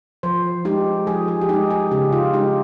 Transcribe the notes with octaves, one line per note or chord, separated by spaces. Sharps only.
F3 C5
G#3 D#4 G4
F3 G#4
G#4
G4
G#3 D#4 G#4
G#4
C#3 G4
F4
G#3 D#4 G4